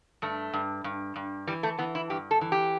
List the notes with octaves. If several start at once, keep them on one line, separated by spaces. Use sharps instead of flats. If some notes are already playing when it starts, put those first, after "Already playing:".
G2 A3
G2
G2
G2
E3 G3
A3
E3 B3
E4
G2 G4
A4
E3
G4